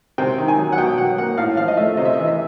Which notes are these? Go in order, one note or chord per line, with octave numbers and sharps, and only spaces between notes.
C3 G5
D#3
G#5
F#3
F#5
B2 G5
F#3 F#5
A#3 F#5
A2 F5
F3 F5
D#5
A3 E5
C3 D#5
E5
E3 D#5
E5